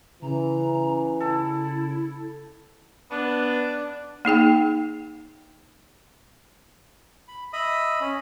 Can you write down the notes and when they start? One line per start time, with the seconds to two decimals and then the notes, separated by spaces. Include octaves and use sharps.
0.22 C#3 E3 A#5
1.20 E4 A4
3.11 B3 D4
4.25 A#3 D#4 G#4 G5
7.28 B5
7.53 D#5 E5 B5 D#6
8.01 C#4